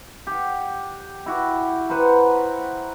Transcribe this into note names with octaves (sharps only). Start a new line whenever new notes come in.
G4 F#5
E4 F#4 G4
B4 C5 F#5 A#5